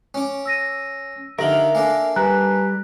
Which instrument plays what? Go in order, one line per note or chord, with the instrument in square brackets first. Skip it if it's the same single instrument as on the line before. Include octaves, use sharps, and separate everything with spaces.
[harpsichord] C#4 D6
[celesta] E6 A#6 D#7
[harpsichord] D3 D#3 [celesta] G4 F#7 G7 [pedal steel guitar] A#4 F5 [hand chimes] E5
[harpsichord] A#3 D4 A4 [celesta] G#5
[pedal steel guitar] G3 [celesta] B4 G#5 [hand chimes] A#5 F#6